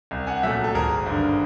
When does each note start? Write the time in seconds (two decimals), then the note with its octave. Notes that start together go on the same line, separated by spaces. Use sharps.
0.11 C2
0.27 F#5 G#5
0.43 A#2 F#3 A3 E5 F#5
0.64 A4
0.75 G#1 G#4 A#4
1.06 G2 D3